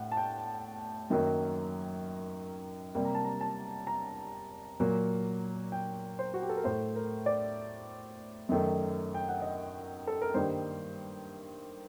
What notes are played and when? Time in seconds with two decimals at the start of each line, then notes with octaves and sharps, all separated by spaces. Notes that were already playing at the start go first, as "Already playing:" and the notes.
Already playing: A2 F#5
0.12 A5
0.17 G5
1.10 F#2 D#3 F#3 A#3
2.95 C3 G3 A#3
3.05 A#5
3.15 A5
3.25 A#5
3.41 A5
3.87 A#5
4.80 A#2 F#3 A#3
5.72 G5
6.19 C5
6.34 F#4
6.42 G4
6.49 A4
6.57 A#4
6.64 A2 A3 C5
6.96 A#4
7.26 D5
8.49 F#2 D#3 A3
9.15 G5
9.28 F#5
9.42 D#5
10.07 A4
10.22 A#4
10.34 G2 D#3 G3 A#3 C5